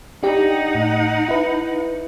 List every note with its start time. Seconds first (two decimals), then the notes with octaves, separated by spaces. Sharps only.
0.23 D4 D#4 G4 F#5
0.75 A2
1.29 E4 B4